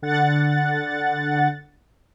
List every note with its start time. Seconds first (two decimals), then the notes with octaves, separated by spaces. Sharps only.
0.02 D3 F#5 A6